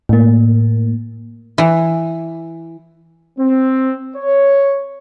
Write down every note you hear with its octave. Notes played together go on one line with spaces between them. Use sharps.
A2 A#3
E3
C4
C#5